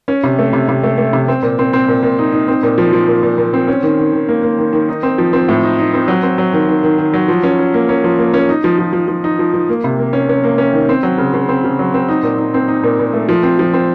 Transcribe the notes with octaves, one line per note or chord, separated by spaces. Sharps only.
C#4
C3
A3
C3
C3
A3
A3
C3
C4
A#2
C4
C4
A#2
A#2
D#4
D#4
C4
A#2
F3
F3
A#2
A#2
A#2
C4
C#4
D#3
D#3
D#3
A#3
A#3
D#3
D#3
D#4
C4
F3
C4
A2
D#4
D#4
C4
F#3
C4
F#3
D#3
D#3
D#3
D#3
F#3
F3
C#4
C#4
A#3
C#4
F3
A#3
C#4
D#4
F3
F3
F3
F3
D#4
F3
F3
A#3
C3
A#3
C#4
C#4
A#3
C#4
D#3
C4
F#3
C#3
C#3
C4
C#3
F#3
C4
D#4
A#2
D#4
C4
D#4
A#2
A#2
A3
F3
C4
F3
C4